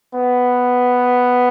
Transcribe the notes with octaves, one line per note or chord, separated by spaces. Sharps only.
B3